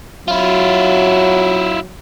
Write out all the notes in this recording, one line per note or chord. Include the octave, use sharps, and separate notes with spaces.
F#3 E4 F4